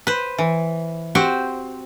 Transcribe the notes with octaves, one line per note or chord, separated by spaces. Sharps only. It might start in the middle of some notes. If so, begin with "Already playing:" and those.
B4 C5
E3
C4 F#4 G4 C5